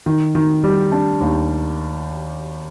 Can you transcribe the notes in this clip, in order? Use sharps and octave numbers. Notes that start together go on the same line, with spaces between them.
D#3
D#3
G3
D4
D#2